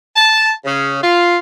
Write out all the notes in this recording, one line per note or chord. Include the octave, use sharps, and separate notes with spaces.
A5
C#3
F4